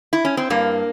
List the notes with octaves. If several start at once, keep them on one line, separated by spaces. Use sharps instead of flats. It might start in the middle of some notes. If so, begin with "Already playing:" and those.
E4
C#4
C4
G2 A#3